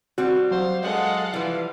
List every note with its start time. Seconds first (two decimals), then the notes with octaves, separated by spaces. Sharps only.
0.18 G3 C4 F#4
0.51 F#3 C5 F5
0.83 G#3 A4 F5 F#5
1.34 E3 F3 G3 F5